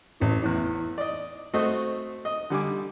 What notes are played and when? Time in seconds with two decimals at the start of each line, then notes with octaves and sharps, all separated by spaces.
0.20 A1 E3
0.42 E2 A2
0.98 D5 D#5
1.54 A3 C4 F#4 C5 D#5
2.25 D#5
2.50 D3 G3 G#5 D6